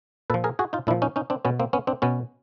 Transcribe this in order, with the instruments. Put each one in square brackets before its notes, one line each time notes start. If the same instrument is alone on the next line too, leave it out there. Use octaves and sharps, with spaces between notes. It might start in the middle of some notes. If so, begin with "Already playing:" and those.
[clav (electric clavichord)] A#2 A4 B4
F3
G#4 A#4
F#4 G#4
D#4 F4
A#2 D4 E4
F3
C#4 D#4
C#4 D#4
C4 D4
B2 B3 C#4
A#3 C4
B3 C#4
C4 D4
B2 B3 C#4